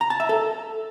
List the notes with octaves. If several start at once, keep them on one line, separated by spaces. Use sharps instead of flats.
A#5
A5
E5
A4